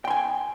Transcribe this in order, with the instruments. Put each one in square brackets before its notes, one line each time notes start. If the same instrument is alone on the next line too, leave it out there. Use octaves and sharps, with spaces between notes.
[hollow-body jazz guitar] G5
C6
G#5